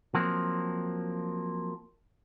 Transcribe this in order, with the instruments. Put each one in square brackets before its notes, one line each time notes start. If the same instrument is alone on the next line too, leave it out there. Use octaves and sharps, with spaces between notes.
[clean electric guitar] F3 F#3 A#3 C4